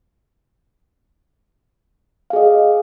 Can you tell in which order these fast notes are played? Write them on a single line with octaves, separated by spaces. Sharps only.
F5 G#4 D#5